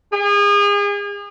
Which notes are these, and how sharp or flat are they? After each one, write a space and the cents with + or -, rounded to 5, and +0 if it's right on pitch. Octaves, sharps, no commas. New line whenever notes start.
G#4 -35